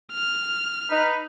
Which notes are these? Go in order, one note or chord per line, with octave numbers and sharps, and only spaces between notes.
F6
D#4 B4